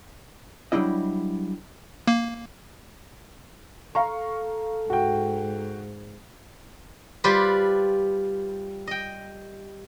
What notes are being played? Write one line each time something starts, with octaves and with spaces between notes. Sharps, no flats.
F#3 G3 D4 E4 D#5
A#3
A4 F5 A#5 C#6
G#2 F#4 G5
G3 F4 G4 B4 C5
D#5 G5